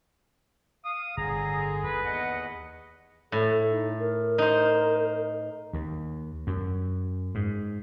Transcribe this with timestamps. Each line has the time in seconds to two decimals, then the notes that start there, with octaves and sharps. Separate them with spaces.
0.85 F5 D#6
1.17 G1 A2 D3 G#4 A#5
1.83 D#2 B4
2.05 E2 D#5 F#5
3.32 A2 A4
3.70 D#4
3.99 A#4
4.38 D#4 C5
5.73 D#2
6.47 F#2
7.35 G#2